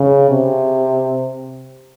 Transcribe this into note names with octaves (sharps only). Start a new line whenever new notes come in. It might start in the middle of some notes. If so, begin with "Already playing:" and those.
Already playing: C#3
C3